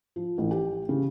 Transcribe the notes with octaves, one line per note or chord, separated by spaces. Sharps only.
F3
A1
G4
C#3